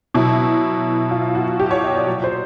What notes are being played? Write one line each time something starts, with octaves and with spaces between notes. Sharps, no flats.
B2 F#3 E4
F4
F#4
G4
C#5
D#5
D5
A#2 F#3
C5